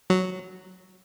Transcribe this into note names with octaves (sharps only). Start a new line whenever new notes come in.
F#3